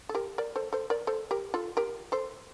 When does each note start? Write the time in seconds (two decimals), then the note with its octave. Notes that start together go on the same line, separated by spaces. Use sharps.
0.09 A4
0.15 G4 A#4
0.38 A#4 D5
0.56 A4 C5
0.73 A4 C5
0.90 A#4 D5
1.07 A4 C5
1.31 G4 A#4
1.54 F4 A4
1.77 G4 A#4
2.12 A4 C5